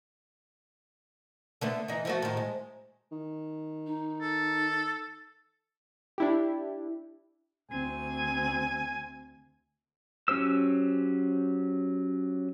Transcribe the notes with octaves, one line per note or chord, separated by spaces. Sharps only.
D3 A3 B3
E3 D#4
F3 A3 F#4
A2 D#3
G#3
D#3
D#4
A4
D4 E4 G4
D2 C4 G#5
F#3 C#4 G4 C5 E6